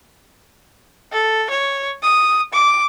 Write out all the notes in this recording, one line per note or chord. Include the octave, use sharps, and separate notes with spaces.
A4
C#5
D#6
D6